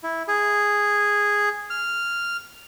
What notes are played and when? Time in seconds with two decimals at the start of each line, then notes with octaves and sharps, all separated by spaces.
0.03 E4
0.28 G#4
1.70 F6